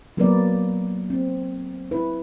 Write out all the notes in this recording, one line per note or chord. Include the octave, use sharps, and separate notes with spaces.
F#3 A#3 B3 A#4 B4 D5
C4
E4 B4